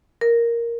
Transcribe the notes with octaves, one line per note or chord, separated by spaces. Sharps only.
A#4